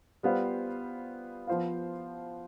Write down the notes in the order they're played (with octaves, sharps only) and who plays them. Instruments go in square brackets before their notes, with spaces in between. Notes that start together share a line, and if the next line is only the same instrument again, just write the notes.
[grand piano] G3 B3 F4 C5 F5
F3 B3 F4 C5 F5